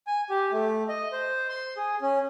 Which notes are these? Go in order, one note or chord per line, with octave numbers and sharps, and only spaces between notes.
G#5
G4
A3
D#5
C5
C6
G#4
C#4